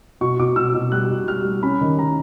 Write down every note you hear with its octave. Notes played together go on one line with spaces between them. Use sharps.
B2 C#6
B2 D6
B2 E6
B2
G3 F#6
B2
G3 F6
G3
C#4 B5
D#3
D#3 A#5